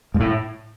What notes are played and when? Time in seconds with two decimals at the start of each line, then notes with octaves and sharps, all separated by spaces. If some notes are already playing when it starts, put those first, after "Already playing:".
0.14 G#2
0.20 A2